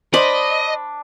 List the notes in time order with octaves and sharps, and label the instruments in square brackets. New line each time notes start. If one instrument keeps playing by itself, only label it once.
[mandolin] D4 [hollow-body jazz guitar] C5 [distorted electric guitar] D#5 [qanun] B5